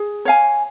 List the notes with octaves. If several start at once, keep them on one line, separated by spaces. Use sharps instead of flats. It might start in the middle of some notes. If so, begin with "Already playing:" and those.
Already playing: G#4
C#5 F5 G#5